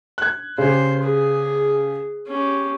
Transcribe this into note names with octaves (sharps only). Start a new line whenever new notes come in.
F#6 G#6
C#3 G4 C5
G#4
C#4 G4